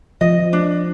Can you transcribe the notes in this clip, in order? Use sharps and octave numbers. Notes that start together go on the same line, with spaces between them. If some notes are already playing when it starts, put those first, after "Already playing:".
F3 D#5
D4